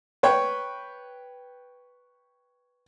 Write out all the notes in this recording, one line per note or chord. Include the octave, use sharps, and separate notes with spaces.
B4 C#5 G5